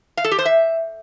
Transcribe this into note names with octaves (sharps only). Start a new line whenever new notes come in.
F5
A4
G4
C5
E5